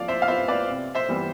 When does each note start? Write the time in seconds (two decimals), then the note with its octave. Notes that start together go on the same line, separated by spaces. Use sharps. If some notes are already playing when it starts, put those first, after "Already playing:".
Already playing: F3 D5 F5
0.08 C5 E5
0.22 F5
0.28 B3 F4 C5 E5
0.48 B4 D5
0.68 C3
0.95 C5 E5
1.09 E3 G3 B3